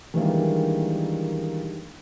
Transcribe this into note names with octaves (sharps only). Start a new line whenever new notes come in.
D#3 E3 G3 G#3 A#3 D4